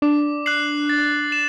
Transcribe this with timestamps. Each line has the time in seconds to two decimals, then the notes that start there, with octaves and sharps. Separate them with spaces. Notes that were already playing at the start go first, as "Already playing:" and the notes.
0.02 D4 D6
0.46 F#6 C7 F#7
0.89 A6
1.32 E7